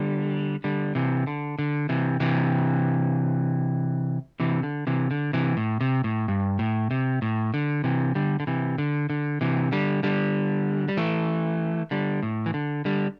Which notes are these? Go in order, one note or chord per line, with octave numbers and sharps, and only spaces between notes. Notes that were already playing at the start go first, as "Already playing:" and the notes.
Already playing: D3 G3
D3 G3
C3 E3
D3
D3
C3 E3
C3 E3
C3 E3
D3
C3 E3
D3
C3 E3
A2
C3
A2
G2
A2
C3
A2
D3
C3 E3
D3 G3
D3
C3 E3
D3
D3
C3 E3
D3 G3
D3 G3
G3
E3 A3
D3 G3
A2
E3
D3
D3 G3